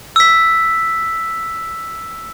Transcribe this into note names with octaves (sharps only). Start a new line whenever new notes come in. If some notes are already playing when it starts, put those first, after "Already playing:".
E6 B6